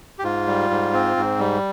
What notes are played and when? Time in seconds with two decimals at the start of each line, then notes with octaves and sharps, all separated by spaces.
0.19 G4
0.23 G#2 F4
0.47 G3
0.70 G#2
0.93 C4
1.17 G#2
1.40 G3